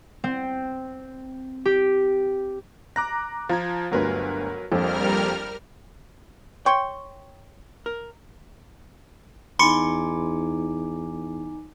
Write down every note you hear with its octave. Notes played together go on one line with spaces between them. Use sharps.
C4
G4
A#5 D6 F#6 A#6
F3 F4 A#5 G#6
G1 D2 F#3 A#4 B4
A#1 F2 G3 A4 A#4 F6
C#5 G5 C6 C#6
A#4
E2 D#4 G#5 B5 C6 D6 C#7